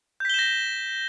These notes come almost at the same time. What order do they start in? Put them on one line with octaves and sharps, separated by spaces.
G6 B6 G7 E7 A#6